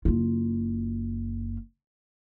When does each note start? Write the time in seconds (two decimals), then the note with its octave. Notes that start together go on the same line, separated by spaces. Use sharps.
0.05 F#1 F4